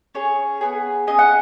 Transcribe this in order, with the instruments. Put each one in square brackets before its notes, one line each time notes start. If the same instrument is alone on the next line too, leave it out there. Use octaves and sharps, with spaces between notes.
[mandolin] C#4 G#4 C#5
B3 G#4
C#4 G#4 D#5
F#5